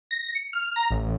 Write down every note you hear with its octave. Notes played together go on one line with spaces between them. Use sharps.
A#6
C#7
F6
A#5
A1